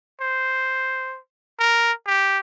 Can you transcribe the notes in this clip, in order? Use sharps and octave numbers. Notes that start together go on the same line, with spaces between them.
C5
A#4
G4